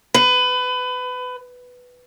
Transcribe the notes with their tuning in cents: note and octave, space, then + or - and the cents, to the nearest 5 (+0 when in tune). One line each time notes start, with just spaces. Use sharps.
B4 +25